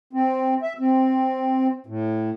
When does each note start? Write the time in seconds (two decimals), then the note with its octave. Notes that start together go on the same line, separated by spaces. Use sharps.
0.13 C4
0.62 E5
0.79 C4
1.86 A2